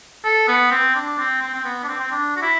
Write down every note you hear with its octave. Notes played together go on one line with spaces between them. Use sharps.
A4
B3
C4
D4
C4
C4
C4
B3
D4
C4
C4
D4
F#4
E4